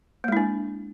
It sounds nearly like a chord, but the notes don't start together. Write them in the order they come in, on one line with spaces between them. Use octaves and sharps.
A#3 G#3 E4 D4